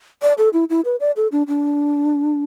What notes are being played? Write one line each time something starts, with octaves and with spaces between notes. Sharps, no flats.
D5
A4
E4
E4
B4
D5
A4
D4
D4